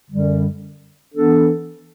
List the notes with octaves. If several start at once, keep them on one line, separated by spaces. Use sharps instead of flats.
F#2 D3 G3
E3 B3 D4 A4